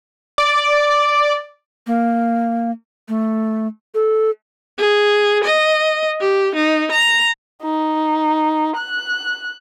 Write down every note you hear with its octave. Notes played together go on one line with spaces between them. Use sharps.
D5
A#3
A3
A4
G#4
D#5
G4
D#4
A#5
D#4
F#6